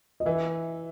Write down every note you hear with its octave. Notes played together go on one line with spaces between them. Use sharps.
D#5
E3 E5